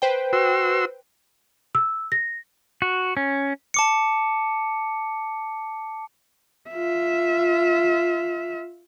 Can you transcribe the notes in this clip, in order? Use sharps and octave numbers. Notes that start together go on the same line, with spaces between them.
B4 C5 G5
F#4 C6 E6
E6
A#6
F#4
C#4
A5 D6 C#7
F4 E5